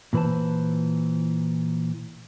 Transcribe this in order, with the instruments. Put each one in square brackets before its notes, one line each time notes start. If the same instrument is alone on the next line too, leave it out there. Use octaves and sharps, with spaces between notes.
[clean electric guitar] A#2 E3 B4 C5 A5